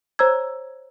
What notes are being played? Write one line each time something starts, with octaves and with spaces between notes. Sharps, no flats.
C5 C#5 A#5 E6 G#6